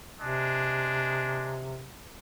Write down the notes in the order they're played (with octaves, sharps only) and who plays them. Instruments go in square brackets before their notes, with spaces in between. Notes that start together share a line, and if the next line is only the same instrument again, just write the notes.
[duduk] C3 [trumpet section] G#3 D4